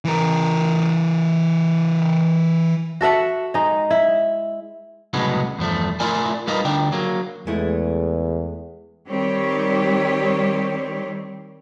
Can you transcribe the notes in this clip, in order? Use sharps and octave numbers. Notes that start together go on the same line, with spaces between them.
E3 A#4
F#4 A4 E5 F#5
G#3 D#4
E4
C2 A2 C#3 F#3 G#3 B3
E2 G2 F3 A3
A3 E4 F4 A#4 D5 G#5
G3 D#4 F4 A#4 B4 D#5
D2 D3 G3 D4 G5
F#3 A#3
E2 G#3 A3 E4
D#3 G3 C4 G4 C#5